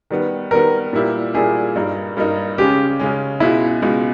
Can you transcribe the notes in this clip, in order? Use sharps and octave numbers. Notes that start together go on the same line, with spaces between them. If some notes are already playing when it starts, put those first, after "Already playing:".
D#3 G3 B3
D#3 G3 B3 A#4
A#2 G3 A#3 E4 G4
A#2 G3 A#3 E4 G4 G#4
G2 G3 A#3 D#4 A#4
G2 G3 A#3 D#4 A#4
C#3 G#3 C#4 G4
C#3 G#3 C#4
C#2 B2 G#3 E4
C#2 B2 G#3